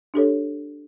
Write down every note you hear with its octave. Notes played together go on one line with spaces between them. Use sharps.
D4 G4 A4 C#5